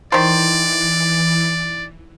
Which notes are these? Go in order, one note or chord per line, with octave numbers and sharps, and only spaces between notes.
D#3 E3 C5 D5